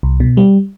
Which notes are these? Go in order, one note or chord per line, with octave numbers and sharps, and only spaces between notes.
C2
B2
G3